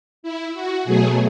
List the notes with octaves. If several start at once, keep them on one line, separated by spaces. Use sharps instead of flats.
E4
F#4
B2 F#3 A3 G#4